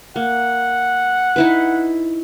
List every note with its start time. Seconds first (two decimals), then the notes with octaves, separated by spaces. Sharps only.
0.16 A#3 F#5
1.36 D#4 E4 B4